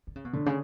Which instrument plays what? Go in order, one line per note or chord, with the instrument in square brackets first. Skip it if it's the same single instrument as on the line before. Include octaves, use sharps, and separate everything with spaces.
[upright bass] D3
C#3
B2
[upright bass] A2 [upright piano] D3
[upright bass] C#3